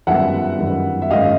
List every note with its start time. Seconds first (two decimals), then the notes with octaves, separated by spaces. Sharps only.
0.07 G1 F#2 D#3 G3 E5 F#5
0.58 G1 F#2 D#3 G3
1.02 E5
1.10 G#1 F#2 D#3 G#3 D#5 F5